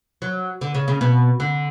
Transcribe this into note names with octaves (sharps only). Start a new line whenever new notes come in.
F#3
D3
C#3
C#3
B2
D3